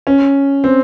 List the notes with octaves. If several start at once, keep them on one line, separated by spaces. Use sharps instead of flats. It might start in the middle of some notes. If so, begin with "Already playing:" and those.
C#4
C4